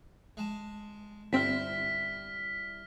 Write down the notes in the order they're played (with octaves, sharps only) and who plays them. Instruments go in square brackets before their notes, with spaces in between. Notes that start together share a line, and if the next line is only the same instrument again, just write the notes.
[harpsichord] G#3 A5
[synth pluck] G1 C4 [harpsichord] G3 E4 [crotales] F6 B6